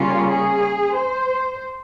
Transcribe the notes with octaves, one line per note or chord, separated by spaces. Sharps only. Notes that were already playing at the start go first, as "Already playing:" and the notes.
Already playing: C#3 G3 A#3 C#4 F4
G#4
C5